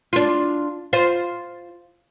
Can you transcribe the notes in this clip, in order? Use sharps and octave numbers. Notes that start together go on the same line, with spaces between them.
D4 F4
F4 C5